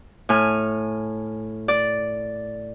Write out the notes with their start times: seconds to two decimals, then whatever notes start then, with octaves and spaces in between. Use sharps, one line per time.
0.29 A2 G#5 F6
1.68 D5